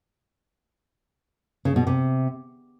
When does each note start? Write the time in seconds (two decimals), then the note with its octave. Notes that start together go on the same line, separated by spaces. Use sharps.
1.65 C#3
1.76 B2
1.87 C3